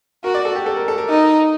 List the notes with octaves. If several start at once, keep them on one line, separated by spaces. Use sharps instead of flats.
F#4 A#4
D5
A4
G4
A4
A#4
A4
A#4
D#4